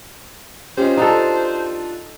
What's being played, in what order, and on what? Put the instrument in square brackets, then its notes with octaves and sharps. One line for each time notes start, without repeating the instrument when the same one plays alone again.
[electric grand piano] C#4 F4 D#5 [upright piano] G4 [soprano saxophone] C5
[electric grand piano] D4 F4 [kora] D#4 A4